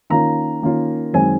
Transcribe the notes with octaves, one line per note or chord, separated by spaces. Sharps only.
D#3 A#3 C#4 F4 A#5
D#3 A#3 C#4 F4
F#2 D#3 G#3 C4 G#5